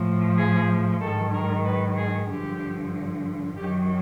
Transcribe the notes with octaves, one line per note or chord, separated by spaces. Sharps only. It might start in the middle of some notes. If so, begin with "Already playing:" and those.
Already playing: A2 F3
G#4
G#2 D#3 F#3 A4
A#4
B4
G#4
G2 D3 F3 G4
F#2 D#3 F#3 G4